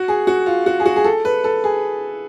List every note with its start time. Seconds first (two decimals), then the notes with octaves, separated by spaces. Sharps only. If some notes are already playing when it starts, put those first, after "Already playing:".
Already playing: F#4
0.08 G#4
0.27 F#4
0.46 F4
0.66 F#4
0.80 G#4
0.86 F#4
0.96 G#4
1.04 A4
1.25 B4
1.44 A4
1.64 G#4